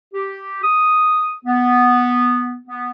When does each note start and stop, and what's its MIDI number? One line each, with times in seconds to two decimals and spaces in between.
0.14 0.60 67
0.63 1.35 87
1.45 2.58 59
2.67 2.91 59